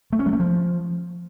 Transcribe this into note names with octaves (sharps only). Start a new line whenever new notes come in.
A3
C#4
G3
A3
F3